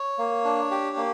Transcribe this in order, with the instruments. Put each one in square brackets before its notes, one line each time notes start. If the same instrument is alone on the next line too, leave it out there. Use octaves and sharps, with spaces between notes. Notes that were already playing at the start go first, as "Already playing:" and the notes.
Already playing: [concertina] C#5
A#3
D4
G4
A#3